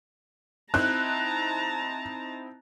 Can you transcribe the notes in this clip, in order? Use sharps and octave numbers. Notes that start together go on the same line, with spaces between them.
C4 D#4 E4 A5 A#5 F#6